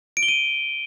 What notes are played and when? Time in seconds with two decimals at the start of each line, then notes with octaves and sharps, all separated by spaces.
0.17 D7
0.23 G7
0.28 D#7